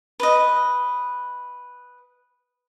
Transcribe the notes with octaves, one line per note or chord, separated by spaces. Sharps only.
B4 D#5